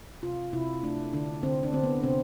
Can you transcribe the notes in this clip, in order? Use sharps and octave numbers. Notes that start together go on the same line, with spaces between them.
C3 F4
C3 E4
A3 D4
D3 D4
D3 C4
D4
D3 C4
B3
C3 C4